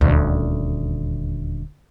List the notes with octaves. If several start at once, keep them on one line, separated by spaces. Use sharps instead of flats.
D#1 D2